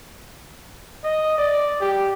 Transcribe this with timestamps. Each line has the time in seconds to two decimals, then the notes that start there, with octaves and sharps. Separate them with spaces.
1.04 D#5
1.38 D5
1.81 G4